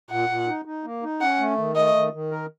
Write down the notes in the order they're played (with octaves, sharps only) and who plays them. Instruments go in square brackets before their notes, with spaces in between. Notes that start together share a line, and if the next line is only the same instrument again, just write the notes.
[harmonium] A#2 [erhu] F#5
[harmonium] A#2
D#4
D#4
A#3
D#4
[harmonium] C#4 [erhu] F#5
[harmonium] A3
D#3
[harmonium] A3 [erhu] D#5
[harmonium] D#3
D#3
A#4